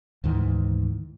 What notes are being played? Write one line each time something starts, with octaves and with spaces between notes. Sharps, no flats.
D2 G#2 D#3 E3